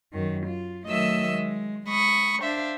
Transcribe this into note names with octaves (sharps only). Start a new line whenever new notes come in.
F#2 D#3
F4
D#3 F#3 A3 D#5 E5 E6
G#3
G#3 B5 C#6 D#6
D4 C5 E5 F5